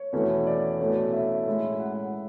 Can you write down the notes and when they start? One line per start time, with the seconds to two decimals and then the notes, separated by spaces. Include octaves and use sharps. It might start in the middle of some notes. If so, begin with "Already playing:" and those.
Already playing: C#5
0.13 E2 B2 A3 C#4 E4
0.47 D5
0.80 B2 A3 C#4 E4
1.13 E5
1.46 A2 G#3 C#4 E4
1.80 F#5